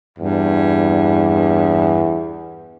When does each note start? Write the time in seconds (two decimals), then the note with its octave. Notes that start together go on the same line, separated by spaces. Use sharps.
0.19 E2 G2